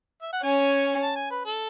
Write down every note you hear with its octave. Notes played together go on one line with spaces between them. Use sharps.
E5
F#5
C#4 G#5
A5
G#5
B4
A4